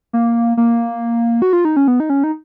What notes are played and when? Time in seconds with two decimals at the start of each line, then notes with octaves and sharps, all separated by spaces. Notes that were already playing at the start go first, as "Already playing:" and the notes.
0.13 A#3
0.57 A#3
1.42 F#4
1.53 F4
1.65 D#4
1.77 C#4
1.88 B3
2.00 D#4
2.10 C#4
2.24 D#4